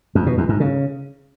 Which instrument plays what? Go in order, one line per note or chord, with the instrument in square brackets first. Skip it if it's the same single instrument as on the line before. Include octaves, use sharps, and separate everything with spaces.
[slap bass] F2
B2
E2
G#2
C#3